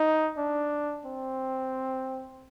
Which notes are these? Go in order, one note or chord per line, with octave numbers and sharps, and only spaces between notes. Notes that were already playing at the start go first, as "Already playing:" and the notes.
Already playing: D#4
D4
C4